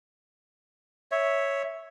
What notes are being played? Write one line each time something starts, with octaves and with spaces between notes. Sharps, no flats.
C#5 E5